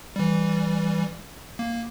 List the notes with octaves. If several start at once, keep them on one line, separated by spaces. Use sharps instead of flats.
E3 G3
A#3